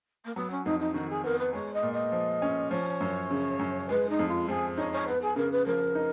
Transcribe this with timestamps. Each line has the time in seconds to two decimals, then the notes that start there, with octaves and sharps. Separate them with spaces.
0.25 A#3
0.35 F#3 B3
0.51 C#4
0.65 F2 D#4
0.79 D#4
0.94 D#3 F#4
1.09 G#4
1.24 B3 A#4
1.39 B4
1.53 G#3 C#5
1.73 D#5
1.83 A#2
1.93 D#5
2.12 F3
2.42 C#4
2.71 F3 C#5
3.00 F#2
3.31 C#3
3.59 F#2
3.89 G#3 B4
4.09 D#4
4.19 F2
4.28 F4
4.48 F3 G#4
4.77 D#4 C#5
4.92 C#5
5.07 B3 B4
5.21 G#4
5.36 C#3 A#4
5.51 B4
5.66 F3 A#4
5.95 D#4